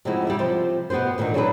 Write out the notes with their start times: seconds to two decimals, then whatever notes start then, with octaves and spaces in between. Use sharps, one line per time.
0.05 C3 F3 G#3 D#4 E4 F#4
0.27 G3 E4 E5
0.39 C3 F3 C5
0.90 B2 B3 G4 B4 C5
1.18 A#2 D3 D#3 B3 D#4
1.34 F#3 D4 E4 G#4 A#4 B4